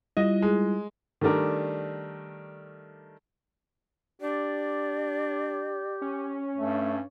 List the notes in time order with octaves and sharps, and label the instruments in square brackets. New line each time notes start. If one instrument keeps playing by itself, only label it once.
[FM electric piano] G3 E4 F4 [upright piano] D#5
[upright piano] G#3
D#3 G3 A3 D4 A#4
[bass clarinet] D4 [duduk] G4 [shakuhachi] D5
[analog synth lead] C#4
[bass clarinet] G2 [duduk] A3